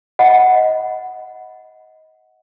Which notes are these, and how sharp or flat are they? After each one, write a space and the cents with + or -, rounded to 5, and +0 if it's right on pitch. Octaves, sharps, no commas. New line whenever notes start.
D#5 +20 F#5 +0 B5 +0